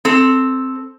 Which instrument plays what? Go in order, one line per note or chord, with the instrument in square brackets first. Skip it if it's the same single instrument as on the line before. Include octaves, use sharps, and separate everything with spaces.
[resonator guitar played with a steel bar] C4 A4